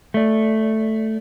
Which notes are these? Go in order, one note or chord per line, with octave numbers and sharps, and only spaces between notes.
A3 D5